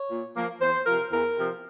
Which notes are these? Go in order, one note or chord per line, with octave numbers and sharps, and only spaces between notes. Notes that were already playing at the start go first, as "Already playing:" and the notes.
Already playing: C#5
A#2
F3 A#3
E2 C5
C3 F3 A#4
E2 A#4
C3 F3